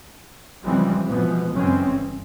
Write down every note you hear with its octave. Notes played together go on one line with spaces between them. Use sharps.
C#3 E3 F3 G3 G#3 C4
B2 E3 F3 G#3 B3
F#2 C#3 E3 G#3 C4 C#4
G1